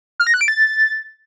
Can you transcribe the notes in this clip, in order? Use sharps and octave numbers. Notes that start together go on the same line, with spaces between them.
F6
A#6
F#6
D7
A6